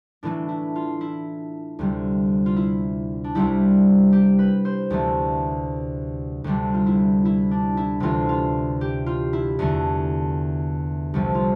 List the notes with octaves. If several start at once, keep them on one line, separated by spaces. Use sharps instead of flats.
A2 E3 A3 D4
E4
F4
E4
D2 C3 G3
F4
E4
D4
C2 C3 G3 E4
G4
B4
C5
D2 C3 E3 A3
D2 C3 G3 D4
F4
E4
E4
D4
E4
D2 C3 E3 A3 F4
F4
G4
F4
E4
E2 D3 A3
C2 C3 F3 A3
F4